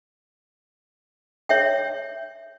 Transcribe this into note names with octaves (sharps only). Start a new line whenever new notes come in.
C#5 E5 G5